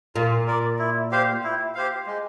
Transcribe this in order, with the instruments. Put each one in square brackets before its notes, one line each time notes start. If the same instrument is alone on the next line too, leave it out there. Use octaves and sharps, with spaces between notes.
[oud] A#2 [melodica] F4
[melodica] A#4 D5
E4
G4 C5 F5
E4
G4 C5 F5
G#3